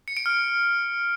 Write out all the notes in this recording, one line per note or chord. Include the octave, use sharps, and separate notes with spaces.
C#7
D7
F6